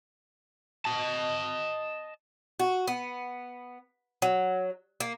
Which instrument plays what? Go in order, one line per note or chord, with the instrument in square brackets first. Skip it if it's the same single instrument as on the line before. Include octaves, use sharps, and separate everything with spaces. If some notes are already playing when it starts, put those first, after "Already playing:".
[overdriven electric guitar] D#5 A5
[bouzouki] F#4
B3
F#3
A#3